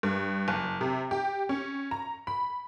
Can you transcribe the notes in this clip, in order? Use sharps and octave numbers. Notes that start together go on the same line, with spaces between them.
G2
F#1
C3
G4
C#4
A#5
B5